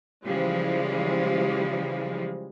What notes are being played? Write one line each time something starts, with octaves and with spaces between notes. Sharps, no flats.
C#3 E3 F3 G3 G#3